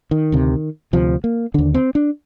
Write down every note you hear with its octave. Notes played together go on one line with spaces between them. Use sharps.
D#3
D2 C3
D2 C3 F3
A#3
D#2 D3 D4
C4
D4